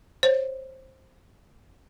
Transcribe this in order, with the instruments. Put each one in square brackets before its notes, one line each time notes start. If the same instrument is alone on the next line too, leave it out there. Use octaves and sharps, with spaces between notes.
[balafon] C5 C#5